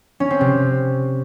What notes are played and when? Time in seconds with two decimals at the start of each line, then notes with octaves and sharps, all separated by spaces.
0.20 C#4
0.30 C4
0.41 C3